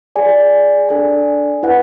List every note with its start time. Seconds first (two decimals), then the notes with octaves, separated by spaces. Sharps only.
0.16 G#4 D5 G#5
0.89 D4 A4 D5 G#5
1.63 E4 B4 F#5